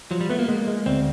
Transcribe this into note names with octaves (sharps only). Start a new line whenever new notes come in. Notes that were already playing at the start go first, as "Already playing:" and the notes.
F3 F#3
G3
A3 B3
A#3
G#3
G#3
D2 C4